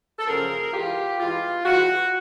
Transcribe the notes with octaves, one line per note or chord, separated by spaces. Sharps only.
A4
F#2 C#3 F3 A#3 G#4 A#4
G2 E3 G#3 F4 G4
G2 E3 G#3 F4
G2 E3 G#3 F#4